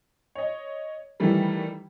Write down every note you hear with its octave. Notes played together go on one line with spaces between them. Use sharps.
C#5 D#5
D#3 E3 G3 A3